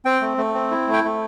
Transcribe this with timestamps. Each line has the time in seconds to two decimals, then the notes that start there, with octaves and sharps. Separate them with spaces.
0.05 C4 G5
0.21 A3
0.38 A3
0.54 C4
0.71 E4
0.88 A3
0.93 G5
1.04 A3